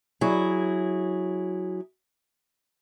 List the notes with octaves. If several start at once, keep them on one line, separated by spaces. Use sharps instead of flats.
F#3 E4 G#4